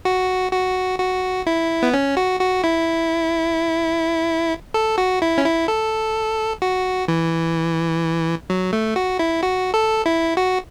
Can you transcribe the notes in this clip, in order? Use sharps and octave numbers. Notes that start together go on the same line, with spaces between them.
F#4
F#4
F#4
E4
B3
C#4
F#4
F#4
E4
A4
F#4
E4
C#4
E4
A4
F#4
E3
F#3
A3
F#4
E4
F#4
A4
E4
F#4